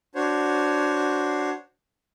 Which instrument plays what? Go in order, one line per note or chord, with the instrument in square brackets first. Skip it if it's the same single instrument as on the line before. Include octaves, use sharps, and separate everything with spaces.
[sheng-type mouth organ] D4 F#4 C5 C#5